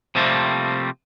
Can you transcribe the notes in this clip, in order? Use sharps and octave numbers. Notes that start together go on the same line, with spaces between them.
C3 F3 G3 A3 A#3 C4